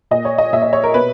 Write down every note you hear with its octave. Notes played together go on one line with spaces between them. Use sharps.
A#2 D#5
C#5
D#5
A#2 E5
D#5
C#5
A#4
B2 B4